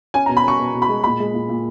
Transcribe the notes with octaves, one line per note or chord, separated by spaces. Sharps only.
C#4 G#5
A#5
B2
B5
C#4 C#6
B2
B2
B5
G#3
A#2 B5
G#3
A#2
A#2